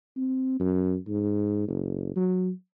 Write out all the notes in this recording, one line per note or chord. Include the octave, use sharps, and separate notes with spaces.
C4
F#2
G#2
F#1
F#3